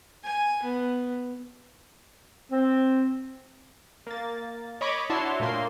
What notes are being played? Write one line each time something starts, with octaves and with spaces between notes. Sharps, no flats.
G#5
B3
C4
A#3 A6
C#5 D#5 B5 C#6 D6
D4 E4 F#4 C#5 A5 C6
A#2 A3 A#3 C6